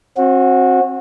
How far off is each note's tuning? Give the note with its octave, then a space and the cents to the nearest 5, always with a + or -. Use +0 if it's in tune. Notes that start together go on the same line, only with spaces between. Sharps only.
C4 +35 F#4 -20